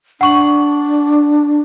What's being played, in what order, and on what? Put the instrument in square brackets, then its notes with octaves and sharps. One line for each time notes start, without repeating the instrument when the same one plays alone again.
[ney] D4 [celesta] F#5 C#6 F#7